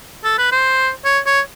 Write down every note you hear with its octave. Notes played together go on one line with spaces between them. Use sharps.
A4
B4
C5
C#5
C#5